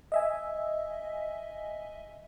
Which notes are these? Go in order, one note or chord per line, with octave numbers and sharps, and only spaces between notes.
D#5 E5 G#5